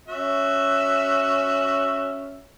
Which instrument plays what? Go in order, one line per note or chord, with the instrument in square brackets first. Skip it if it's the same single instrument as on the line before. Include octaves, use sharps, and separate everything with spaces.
[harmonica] C#4 F#4 E5